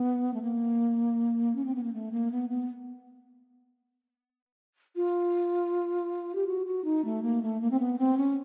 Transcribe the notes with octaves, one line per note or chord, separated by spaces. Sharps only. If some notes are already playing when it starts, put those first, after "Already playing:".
Already playing: B3
A3
A#3
C#4
C4
B3
A#3
A3
A#3
B3
B3
F4
G4
F#4
F#4
D#4
A3
A#3
A3
A#3
C4
B3
C4
C#4